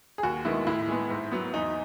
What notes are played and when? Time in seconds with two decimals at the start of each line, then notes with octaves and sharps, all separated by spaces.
0.18 G#4
0.23 D#2 F#4
0.45 D#3 G#3 B3 E4
0.67 A2 E4
0.88 G#3 B3
1.10 G#2
1.32 F#3 B3
1.54 E2 D#4